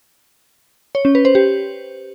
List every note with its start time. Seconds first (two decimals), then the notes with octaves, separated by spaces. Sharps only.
0.95 C#5
1.05 C#4
1.15 B4
1.25 C5
1.35 G4